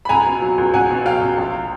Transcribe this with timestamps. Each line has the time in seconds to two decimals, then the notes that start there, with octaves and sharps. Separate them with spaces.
0.05 B5
0.09 C#2 G#5 A#5
0.26 B2
0.42 F#3
0.58 C#2
0.73 C#2 F#5 G#5
0.89 B2
1.05 F#3 F5 G5
1.21 C#2
1.38 A#1